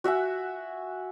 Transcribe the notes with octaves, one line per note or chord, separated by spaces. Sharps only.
F#4 E5 F#5 G#5